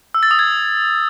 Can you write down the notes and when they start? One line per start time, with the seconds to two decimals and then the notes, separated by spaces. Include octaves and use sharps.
0.14 E6
0.23 A6
0.31 D#6
0.39 G#6